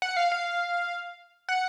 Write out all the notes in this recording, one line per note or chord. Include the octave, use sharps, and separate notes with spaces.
F#5
F5
F5
F#5